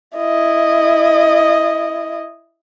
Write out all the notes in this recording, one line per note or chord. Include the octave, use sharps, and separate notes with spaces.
E4 D#5